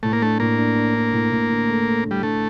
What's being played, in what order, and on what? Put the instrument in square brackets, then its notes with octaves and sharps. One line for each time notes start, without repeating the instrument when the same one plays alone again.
[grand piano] A2 [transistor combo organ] A3
[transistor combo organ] A#3
[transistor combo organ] A3 [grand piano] D4
[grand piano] A2 [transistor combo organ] A#3
[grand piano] D4
D4
D4
A2
A2
D3
A3
A3
D3
[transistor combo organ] G3
[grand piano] D3 [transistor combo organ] A3